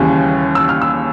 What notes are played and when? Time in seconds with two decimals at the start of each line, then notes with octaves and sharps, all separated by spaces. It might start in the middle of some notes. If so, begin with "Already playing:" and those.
Already playing: D#2 C#3 E3 G3
0.55 E6
0.69 F6
0.82 E6